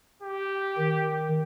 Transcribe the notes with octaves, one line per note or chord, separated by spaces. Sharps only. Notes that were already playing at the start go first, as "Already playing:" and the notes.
G4
D#3